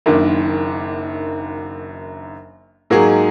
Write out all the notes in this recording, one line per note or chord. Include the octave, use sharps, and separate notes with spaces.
F#1 F#2 D#3 A#3 D4
G#2 F#3 A#3 D#4 G#4